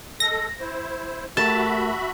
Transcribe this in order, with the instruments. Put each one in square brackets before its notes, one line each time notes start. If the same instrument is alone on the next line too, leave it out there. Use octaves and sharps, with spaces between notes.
[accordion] G#3 A4 [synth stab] A#6
[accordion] E4 C5
[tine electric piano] A3 G4 A#4 [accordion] F#4 E5 B5 [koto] A5